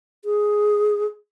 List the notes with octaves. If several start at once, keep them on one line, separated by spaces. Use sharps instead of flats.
G#4